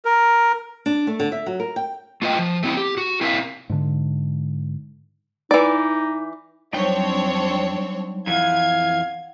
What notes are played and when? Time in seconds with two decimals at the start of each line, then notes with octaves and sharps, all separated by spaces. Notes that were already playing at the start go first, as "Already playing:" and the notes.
0.05 A#4
0.86 D4
1.07 A3
1.20 D3
1.32 E5
1.46 F#3
1.60 A#4
1.76 G5
2.22 A3 F4 B4 D#5 G5
2.39 F3
2.63 A3 C4 E4
2.77 G4
2.97 F#4
3.21 C4 E4 A#4 E5 F5
3.70 G#2 D3
5.51 E3 D#4 D5
6.73 F2 F#3 G3 C4 D4 D#4 C#5 G5
8.27 F2 E3 F5 F#5 G#6